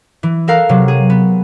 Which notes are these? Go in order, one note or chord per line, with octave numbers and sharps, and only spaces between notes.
E3
A4 A#4 F5 F#6
C3 F#3
G#4
B3